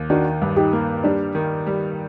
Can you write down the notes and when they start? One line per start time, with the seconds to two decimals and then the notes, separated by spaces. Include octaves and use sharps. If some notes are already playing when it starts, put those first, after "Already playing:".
Already playing: D#2
0.10 D#3 D4 F#4
0.42 G2
0.56 D#4 G4
0.73 A#3
1.04 G3 D4
1.35 D#3
1.66 G3